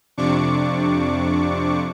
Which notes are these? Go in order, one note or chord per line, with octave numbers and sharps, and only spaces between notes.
F2 C3 D4 C#6 D6